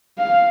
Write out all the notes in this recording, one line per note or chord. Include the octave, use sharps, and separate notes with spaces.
F5